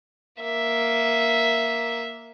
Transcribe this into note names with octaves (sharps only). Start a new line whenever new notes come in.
A#3 E5